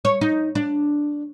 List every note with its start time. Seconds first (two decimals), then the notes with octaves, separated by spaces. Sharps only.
0.05 C#5
0.21 D#4
0.55 D4